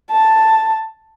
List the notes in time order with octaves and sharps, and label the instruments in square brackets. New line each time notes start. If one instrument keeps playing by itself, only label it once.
[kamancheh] A5